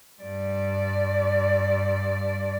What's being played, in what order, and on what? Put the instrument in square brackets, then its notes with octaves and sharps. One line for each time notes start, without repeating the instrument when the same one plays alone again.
[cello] G2 D5